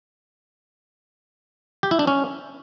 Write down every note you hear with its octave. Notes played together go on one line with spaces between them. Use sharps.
G4
E4
D4
C#4